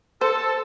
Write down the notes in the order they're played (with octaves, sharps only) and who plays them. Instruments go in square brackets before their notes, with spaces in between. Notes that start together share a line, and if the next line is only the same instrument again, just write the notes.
[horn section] A4 [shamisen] C5